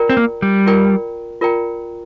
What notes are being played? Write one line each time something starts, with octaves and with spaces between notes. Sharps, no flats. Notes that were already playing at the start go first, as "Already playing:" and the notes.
Already playing: F4 A#4 D5 G5 A#5
C4
A#3
G3
F4 A#4 D5 G5 A#5
F4 A#4 D5 G5 A#5